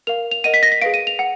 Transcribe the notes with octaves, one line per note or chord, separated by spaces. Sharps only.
A#4 F5 F7
F7
A#4 D#5 F#5 D#7
B6
A#6
B6
G#4 B4 F5 D7
D#7
F7
F#5